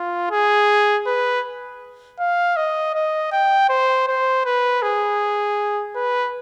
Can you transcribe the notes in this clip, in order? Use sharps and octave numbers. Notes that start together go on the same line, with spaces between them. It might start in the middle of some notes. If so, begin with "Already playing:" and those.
Already playing: F4
G#4
B4
F5
D#5
D#5
G5
C5
C5
B4
G#4
B4